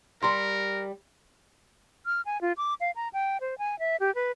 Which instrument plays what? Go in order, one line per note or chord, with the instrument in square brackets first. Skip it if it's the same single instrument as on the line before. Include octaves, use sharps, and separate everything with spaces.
[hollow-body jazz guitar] G3 A#5 [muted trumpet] A#4 [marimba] C6
[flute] F6
G#5
F4
D6
F5
A#5
G5
C5
G#5
E5
G4
B4